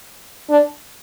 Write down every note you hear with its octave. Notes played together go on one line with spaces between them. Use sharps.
D4